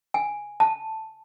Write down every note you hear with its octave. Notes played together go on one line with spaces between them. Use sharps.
G#5
A5